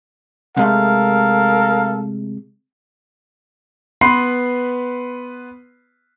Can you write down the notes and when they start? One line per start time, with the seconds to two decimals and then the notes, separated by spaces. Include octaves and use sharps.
0.57 C3 G#3 A3 A4 A#4 F5
4.01 B3 B4 B5 C6 C7